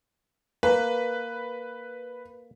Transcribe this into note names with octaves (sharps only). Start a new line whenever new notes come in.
A#3 B4